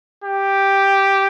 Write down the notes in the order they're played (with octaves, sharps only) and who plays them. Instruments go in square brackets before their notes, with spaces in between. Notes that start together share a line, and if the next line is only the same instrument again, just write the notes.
[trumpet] G4